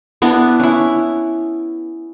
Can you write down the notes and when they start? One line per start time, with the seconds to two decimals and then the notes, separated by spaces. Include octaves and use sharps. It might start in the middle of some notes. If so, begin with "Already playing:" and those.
0.22 B3 D4 E4
0.60 C#4 E4